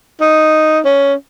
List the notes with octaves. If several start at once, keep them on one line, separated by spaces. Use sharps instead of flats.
D#4
C#4